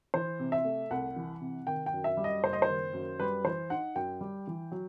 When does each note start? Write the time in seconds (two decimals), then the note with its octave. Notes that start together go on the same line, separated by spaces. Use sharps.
0.14 E3 C5
0.39 C3
0.52 E5
0.65 A3
0.91 C2 F#5
1.16 E3
1.41 C3
1.67 D#3 G5
1.86 G5
1.93 F#2
2.04 E5
2.17 G3
2.24 D#5
2.43 F#1 C5
2.53 D#5
2.62 C5
2.68 D#3
2.93 F#2
3.20 G3 B4
3.44 E3 C5
3.70 D#4 F#5
3.95 F#2 G5
4.21 G3
4.47 E3
4.72 F#3